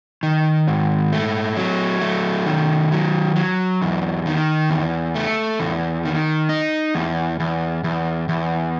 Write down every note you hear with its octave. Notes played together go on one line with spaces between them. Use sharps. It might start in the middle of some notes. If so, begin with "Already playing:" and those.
D#3
G#2
A3
F#3
A3
D#3
F#3
F#3
E2
D#3
E2
A3
E2
D#3
D#4
E2
E2
E2
E2